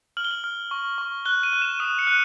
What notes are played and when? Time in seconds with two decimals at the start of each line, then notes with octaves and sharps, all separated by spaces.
0.17 F6 F#7
0.25 G7
0.31 F#7
0.44 F6
0.71 C#6
0.98 C#6
1.25 F#6 G7
1.43 D#7
1.53 F#6
1.62 E7
1.80 D#6 D#7
1.99 C#7
2.07 F#6